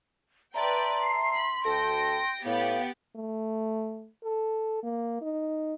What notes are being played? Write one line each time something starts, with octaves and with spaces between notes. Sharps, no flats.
B4 D5 E5 G5 A5 A#5 C6
C7
B5
D2 A4 G5 A#6 D7
A2 B3 G4 F5 A6
A3
A4
A#3
D#4